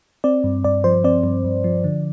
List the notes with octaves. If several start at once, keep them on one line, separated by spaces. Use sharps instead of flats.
C4 D5
G2
G2 D5
F3 C5
C4 D5
G2
G2
F3
D3